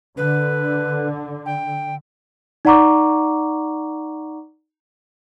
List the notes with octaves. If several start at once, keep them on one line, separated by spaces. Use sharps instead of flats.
D3 B4
G5
D#4 D5 F#5 A#5 C#6 D6